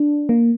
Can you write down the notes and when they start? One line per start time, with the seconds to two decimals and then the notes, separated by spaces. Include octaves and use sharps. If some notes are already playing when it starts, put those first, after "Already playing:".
Already playing: D4
0.29 A#3